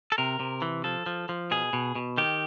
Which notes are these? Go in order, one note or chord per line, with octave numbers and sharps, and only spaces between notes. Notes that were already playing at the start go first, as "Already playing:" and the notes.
A4
C3 A#4
C3
E3
F3 A4
F3
F3
B2 G#4
B2
B2
D#3 G4